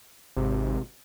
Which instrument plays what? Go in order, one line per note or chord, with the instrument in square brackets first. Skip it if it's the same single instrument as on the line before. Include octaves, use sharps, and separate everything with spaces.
[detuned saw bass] G#1 [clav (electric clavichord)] C3